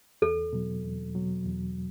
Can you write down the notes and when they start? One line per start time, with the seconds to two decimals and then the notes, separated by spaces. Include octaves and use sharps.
0.22 E2 A4
0.53 B2 F#3
0.84 E2
1.15 B2 F#3
1.46 E2